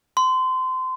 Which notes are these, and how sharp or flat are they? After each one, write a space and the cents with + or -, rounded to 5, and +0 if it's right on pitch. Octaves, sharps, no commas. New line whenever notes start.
C6 -25